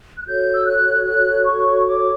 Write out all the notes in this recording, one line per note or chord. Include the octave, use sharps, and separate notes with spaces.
F#6
F#4 A4 C#5 G6
E6
F#6
F#6
C#6
D6